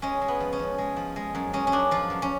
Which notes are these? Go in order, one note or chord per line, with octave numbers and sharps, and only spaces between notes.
G#3 C#4
G#3
B3
F3
C#4
F3
G#3
F3
G#3
F#2
G#3 C#4
C#4
F#2 D4
F3 F4
F#2
C#4